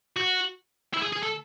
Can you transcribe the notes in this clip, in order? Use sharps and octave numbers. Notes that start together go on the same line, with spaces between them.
F#4
E4
G#4
G#4
A4